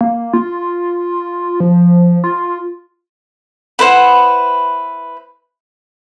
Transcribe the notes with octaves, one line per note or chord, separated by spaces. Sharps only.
A#3
F4
F3
F4
E4 B4 C5 F#5